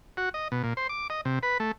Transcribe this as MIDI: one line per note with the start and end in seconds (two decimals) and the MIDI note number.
0.17 0.29 66
0.34 0.48 75
0.52 0.62 47
0.63 0.74 46
0.77 0.87 72
0.89 1.07 86
1.10 1.21 75
1.25 1.39 48
1.43 1.58 71
1.60 1.72 57